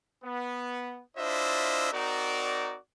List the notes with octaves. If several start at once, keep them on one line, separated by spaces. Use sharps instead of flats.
B3
D4 E4 F4 C5 D#5 E5
C4 D#4 F#4 A#4 D5